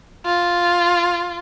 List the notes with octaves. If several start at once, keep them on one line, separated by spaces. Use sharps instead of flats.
F4